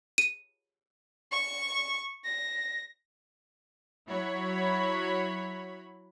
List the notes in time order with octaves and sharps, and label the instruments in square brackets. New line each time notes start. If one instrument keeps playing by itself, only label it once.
[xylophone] D#7
[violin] C#6
A#6
[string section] F#3 E4 F#4 C#5 B5